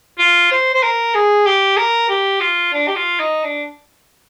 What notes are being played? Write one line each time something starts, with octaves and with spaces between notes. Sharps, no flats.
F4
C5
C5
A#4
G#4
G4
A#4
G4
F4
D4
G4
F4
D#4
D4